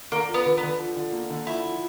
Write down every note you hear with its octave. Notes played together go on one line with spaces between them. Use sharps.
D3 A#3
F3
B3
D3
B3
D3
F3
D3
A#3
D3
F3 E4
F3